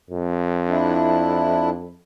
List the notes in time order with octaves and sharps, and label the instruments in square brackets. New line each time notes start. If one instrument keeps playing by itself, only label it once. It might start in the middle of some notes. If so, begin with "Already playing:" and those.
[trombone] F2
[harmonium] D4 E4